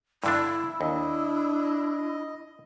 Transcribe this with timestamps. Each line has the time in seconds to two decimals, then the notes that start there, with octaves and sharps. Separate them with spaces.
0.24 G2 D3 D4 E4
0.81 D#2 D4 D#5